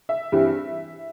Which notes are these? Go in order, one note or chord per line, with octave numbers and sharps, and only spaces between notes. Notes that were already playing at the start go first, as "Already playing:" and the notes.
E5
G2 E3 G3 C4